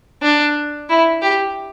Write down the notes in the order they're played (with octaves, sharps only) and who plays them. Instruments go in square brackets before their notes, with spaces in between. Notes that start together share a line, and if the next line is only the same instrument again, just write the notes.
[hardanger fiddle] D4
E4
G4